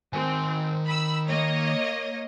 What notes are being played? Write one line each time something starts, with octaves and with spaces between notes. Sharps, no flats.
D#3 C4 G#5
B5 E6
A#3 C#5 D#5